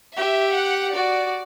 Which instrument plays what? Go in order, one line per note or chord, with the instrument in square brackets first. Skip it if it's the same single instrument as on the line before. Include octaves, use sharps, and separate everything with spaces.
[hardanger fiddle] G4 [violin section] E5
[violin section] F#5
[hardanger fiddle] F#4 [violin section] D5